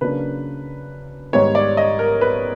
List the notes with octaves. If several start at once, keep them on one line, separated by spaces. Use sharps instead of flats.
C#3 F#3 A#3 D4 B4
G#2 D#3 G3 B3 C#5
D5
D#5
A#4
B4